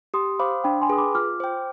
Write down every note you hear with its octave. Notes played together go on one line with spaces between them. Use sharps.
G4 C6 D#6
C5 F5 B5 D6
D4 G5 B5
G#5 C6
G#4 B4 D#6
B5 D6
F4 D6 F6
C5 G5